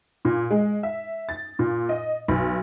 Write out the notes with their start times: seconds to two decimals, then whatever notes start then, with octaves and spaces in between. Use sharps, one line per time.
0.25 A#2
0.50 G#3
0.83 E5
1.29 A6
1.59 A#2
1.89 D#5
2.28 B1